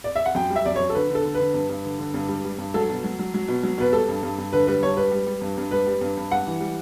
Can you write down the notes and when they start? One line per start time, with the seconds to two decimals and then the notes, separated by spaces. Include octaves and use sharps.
0.04 D5
0.15 E5
0.26 F#5
0.35 F#2 G5
0.50 G3
0.56 E5
0.65 F#2 D5
0.76 F#2 C#5
0.90 A4
0.95 D3 B4
1.10 D3
1.15 A4
1.25 D3
1.35 B4
1.40 D3
1.54 G2
1.69 G2
1.85 D3
1.99 D3
2.14 G2
2.29 G3
2.45 G3
2.58 G2
2.74 F#3 A4
2.89 B2
3.04 F#3
3.19 F#3
3.34 F#3
3.48 B2
3.63 F#3
3.78 B2 B4
3.93 G3 A4
4.08 G2
4.23 G2
4.38 G2
4.53 D3 B4
4.67 G3 B4
4.83 G2 C#5
4.97 G3 B4
5.12 G3
5.26 G3
5.41 G2
5.57 G2
5.71 G3 B4
5.87 G3
6.01 G2
6.17 G2
6.31 G3 F#5
6.47 E3
6.61 G3